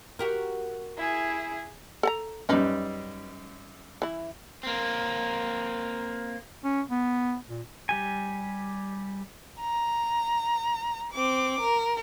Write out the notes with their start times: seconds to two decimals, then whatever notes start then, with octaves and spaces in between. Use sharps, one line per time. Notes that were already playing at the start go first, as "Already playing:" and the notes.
0.19 F#4 G4 A#4
0.97 E4 G#4
2.03 A4 F#5 A#5
2.49 F#2 G3 C#4 D#4 B4
4.02 E3 E4
4.63 A#3 C4
6.64 C#4
6.89 B3
7.49 A#2
7.89 G3 G4 G#5
9.60 A#5
11.13 C4 D6
11.61 A#4